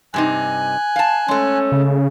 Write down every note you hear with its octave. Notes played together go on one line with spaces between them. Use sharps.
G2 C3 D#4 G#5 F#6
F5 A5
G#3 A3 C#4
C#3